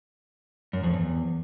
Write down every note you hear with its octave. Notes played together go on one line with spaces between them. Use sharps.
F#2
F2
E2